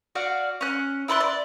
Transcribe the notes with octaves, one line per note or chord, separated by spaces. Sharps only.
F#4 D5 F5 F#5
C#4 F#6
E4 D5 C6 F#6
D5